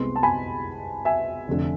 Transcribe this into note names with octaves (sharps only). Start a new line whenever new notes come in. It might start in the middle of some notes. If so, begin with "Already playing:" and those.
Already playing: C2 C3 G#3 B3 C6
A5
G#5 B5
E5 G#5
F1 F2 D3